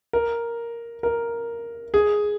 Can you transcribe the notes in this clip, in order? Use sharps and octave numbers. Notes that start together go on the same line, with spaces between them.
A#4
A#4
G#4